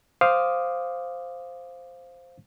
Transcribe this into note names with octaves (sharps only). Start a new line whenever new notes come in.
C5 F5 D6 D#6